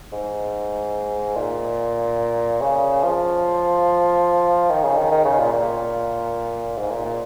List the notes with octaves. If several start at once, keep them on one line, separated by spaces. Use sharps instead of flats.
G#2
A#2
C#3
F3
D#3
C#3
D#3
D#3
C#3
A#2
A#2
G#2
A#2
A#2